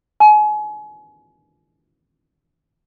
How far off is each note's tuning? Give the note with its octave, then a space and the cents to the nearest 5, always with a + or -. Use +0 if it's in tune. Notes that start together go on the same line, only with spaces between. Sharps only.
G#5 +35